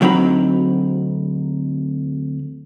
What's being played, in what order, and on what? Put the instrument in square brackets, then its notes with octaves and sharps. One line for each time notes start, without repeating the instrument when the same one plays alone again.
[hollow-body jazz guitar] D2 F#3 C4 D#4 B5